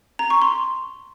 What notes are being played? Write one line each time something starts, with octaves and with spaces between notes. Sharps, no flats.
A#5
C#6
C6